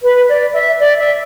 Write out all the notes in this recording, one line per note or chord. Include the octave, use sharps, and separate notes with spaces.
B4
D5
E5
D5
E5